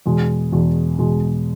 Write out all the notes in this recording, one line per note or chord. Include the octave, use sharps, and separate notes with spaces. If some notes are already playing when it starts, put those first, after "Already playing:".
E2 B2 G#3
E2 B2 G#3
E2 B2 G#3